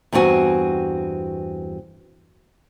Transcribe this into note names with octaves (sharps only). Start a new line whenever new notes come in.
E2 G2 C4 F#4 G#5